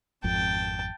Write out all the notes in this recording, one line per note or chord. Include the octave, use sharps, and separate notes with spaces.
G#1 F2 G5 A5